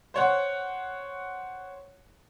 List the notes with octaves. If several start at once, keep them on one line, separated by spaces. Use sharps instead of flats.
C5 C#5 F#5